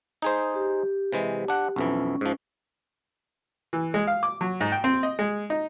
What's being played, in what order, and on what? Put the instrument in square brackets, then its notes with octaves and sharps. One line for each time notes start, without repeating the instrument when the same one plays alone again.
[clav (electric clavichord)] D#4 G#4 C5
[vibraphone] G4
[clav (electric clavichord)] C3 E3 G#3
D4 F#5
[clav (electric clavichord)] B1 F2 E3 [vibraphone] C#4
[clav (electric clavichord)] G#2 F3
[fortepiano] E3
G#3
F5
D6
F#3
G#2
G5
C4
D#5
G#3
D#4